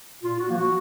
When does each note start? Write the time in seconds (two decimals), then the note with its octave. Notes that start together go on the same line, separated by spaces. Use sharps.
0.23 A#2 F4
0.40 F#4
0.48 F3 A#3
0.56 F#4